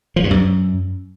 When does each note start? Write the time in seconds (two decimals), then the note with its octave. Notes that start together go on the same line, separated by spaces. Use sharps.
0.16 F3
0.24 G2
0.31 F#2